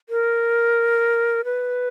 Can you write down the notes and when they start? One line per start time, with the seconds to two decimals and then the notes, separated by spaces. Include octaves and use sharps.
0.09 A#4
1.45 B4